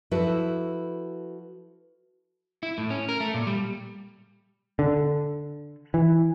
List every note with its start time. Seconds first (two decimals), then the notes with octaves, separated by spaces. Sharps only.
0.11 F3 E4 F#4 A4 B4
2.63 E4
2.78 A2
2.90 C#4
3.09 A#4
3.20 A3
3.34 A#2
3.47 G3
4.79 D3
5.94 E3